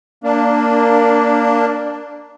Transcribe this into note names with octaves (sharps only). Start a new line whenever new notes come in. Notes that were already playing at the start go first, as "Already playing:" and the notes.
A#3 D4